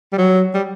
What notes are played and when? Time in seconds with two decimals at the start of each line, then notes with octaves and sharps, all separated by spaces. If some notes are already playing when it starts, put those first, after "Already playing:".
0.13 G3
0.18 F#3
0.54 G3